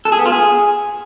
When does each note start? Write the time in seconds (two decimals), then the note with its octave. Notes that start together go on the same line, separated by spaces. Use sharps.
0.05 A4
0.12 G#4
0.19 B3
0.26 F4
0.32 G#4